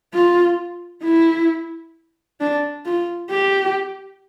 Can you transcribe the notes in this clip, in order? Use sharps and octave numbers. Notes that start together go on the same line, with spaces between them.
F4
E4
D4
F4
G4